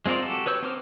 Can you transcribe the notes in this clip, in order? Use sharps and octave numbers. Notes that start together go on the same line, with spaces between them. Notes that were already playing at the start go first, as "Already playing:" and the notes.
G#3 C4 F4 A#4 D5
F#4 G4 A4
B4 C#5 E6 G6
C4 D#4 C5 D6 F6